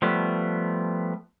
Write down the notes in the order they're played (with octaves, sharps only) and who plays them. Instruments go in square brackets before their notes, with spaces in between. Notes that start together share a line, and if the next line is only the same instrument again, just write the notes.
[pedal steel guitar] F3 G3 A3 B3